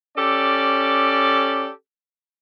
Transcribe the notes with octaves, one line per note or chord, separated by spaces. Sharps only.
C#4 G4 A4 D5